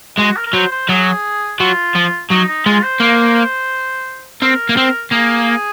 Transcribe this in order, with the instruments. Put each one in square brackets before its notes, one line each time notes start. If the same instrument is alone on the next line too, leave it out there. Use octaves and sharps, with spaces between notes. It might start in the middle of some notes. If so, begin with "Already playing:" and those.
[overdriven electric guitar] G#3 [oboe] F#4
[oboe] A#4
A#4
[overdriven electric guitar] F#3 [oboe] C5
[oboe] C5
[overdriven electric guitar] F#3 [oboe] G#4
[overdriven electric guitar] F#3 [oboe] F4
[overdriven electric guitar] F3
[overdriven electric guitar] F#3 [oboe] D#4
[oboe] D#4
[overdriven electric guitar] G#3 [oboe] F4
[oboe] C5
[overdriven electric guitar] A#3 [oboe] C5
[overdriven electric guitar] C4 [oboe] A#4
[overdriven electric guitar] A#3
C4
[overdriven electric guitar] A#3 [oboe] G#4